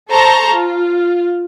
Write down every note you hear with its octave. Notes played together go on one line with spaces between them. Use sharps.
A4 C5 A5 A#5 C#6
F4